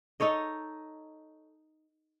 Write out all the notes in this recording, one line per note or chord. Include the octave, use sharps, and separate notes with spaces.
D#4 A4 C#5 D#5